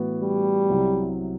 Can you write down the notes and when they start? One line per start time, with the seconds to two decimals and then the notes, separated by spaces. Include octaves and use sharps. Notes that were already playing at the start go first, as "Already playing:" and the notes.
Already playing: A2 E3 B3 F#4
0.22 G3
0.70 C2 C3 F#3